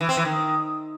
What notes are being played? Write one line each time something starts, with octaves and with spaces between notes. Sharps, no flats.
E3
C4
E3
D#3